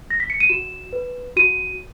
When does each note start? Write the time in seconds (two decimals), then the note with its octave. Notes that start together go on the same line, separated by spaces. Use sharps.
0.10 A#6
0.20 B6
0.30 C#7
0.40 D#7
0.49 F#4 E7
0.93 B4
1.36 F#4 D#7